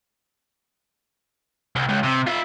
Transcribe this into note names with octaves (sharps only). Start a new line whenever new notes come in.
C2
C#2
C3
F4 E5